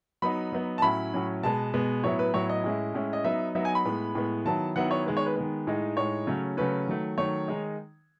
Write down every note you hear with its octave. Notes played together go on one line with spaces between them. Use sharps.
F#3 B3 D#4 B5
F#3 B3 D#4
A5
A2 F#3 C#4 E4 B5
A2 F#3 C#4 E4
B2 G#3 B3 A5
B2 G#3 B3
A2 F#3 B3 E4 C#5
B4
A2 F#3 B3 E4 C#5
D#5
A2 G#3 C#4 E4
A2 G#3 C#4 E4
D#5
F#3 B3 D#4 E5
F#3 B3 D#4 E5
G#5
B5
A2 G#3 B3
A2 G#3 B3
D#3 F#3 B3 E4 A5
D#3 F#3 B3 E4 F#5
C#5
D#3 G#3 B3
C#5
B4
D#3 G#3 B3
A2 G#3 D#4
A2 G#3 D#4 C#5
C#3 F#3 A3 C#4
C#3 F#3 A3 C#4 B4
D#3 F#3 A3
D#3 F#3 A3 C#5
D#3 G#3 D#4